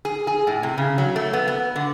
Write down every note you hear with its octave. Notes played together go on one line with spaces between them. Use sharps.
G#4
G#4
A2
C3
C#3
F#3
A3
B3
B3
D3